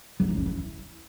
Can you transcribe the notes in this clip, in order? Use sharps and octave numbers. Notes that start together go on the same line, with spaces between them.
F#3
D#4
C#4
E4